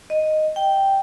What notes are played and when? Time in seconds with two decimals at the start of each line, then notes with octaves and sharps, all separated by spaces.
0.10 D#5
0.56 G5